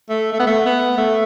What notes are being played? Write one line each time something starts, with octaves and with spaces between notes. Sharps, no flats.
A3
A3
B3
A3
B3
A3